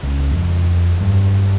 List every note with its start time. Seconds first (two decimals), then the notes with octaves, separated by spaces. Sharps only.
0.03 C#2
0.31 F2
1.01 G2